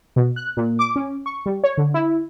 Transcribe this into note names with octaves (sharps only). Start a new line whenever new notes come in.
B2
F#6
A#2
D6
C#4
C#6
G3
C#5
D3
E4